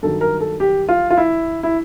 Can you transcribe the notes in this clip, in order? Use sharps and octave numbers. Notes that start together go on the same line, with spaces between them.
G2 D#3 F#3 A4
A#4
A4
G4
F4
F4
E4
E4